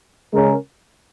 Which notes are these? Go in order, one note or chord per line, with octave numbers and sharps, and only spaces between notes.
C#3 G#3 C#4 A#4